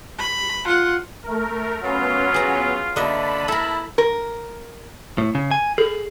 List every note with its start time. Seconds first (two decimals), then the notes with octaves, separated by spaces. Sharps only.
0.19 B5
0.64 F4 F#5
1.23 A3 A#4
1.82 F#3 B3 C#4 F4
2.34 G#4 A#5
2.96 D3 A#3 D#5 E5 A5 B5
3.48 E4 A4 A#4
3.98 A#4
5.18 A2
5.35 C#3
5.51 G#5
5.78 G#4 A4